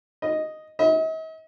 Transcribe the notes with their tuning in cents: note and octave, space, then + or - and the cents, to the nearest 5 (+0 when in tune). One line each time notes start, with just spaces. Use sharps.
D#5 +0
D#5 +45